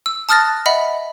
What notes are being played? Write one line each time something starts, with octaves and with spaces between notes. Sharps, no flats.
E6
A5 D#6 F6 F#6 A6 A#6
D#5 E5 F#5 B5